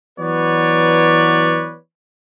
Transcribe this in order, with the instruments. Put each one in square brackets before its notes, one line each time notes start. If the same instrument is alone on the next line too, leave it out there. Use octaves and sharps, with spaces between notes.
[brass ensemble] E3 F#3 B3 B4 C#5 D5